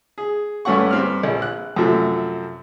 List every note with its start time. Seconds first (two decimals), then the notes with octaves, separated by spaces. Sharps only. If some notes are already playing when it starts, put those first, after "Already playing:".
0.18 G#4
0.65 G2 A3 C#4 F#5 C#6
0.91 G2 C4 F6
1.23 A#1
1.42 F#6
1.76 F#2 C3 F3 A3